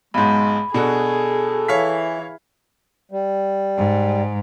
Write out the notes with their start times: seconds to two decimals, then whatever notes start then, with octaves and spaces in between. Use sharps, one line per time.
0.14 B1 G#2 G#3 B5
0.74 B2 D4 F#4 G#4 A4
1.68 E3 C#5 F5 B6
3.11 G3
3.78 G#2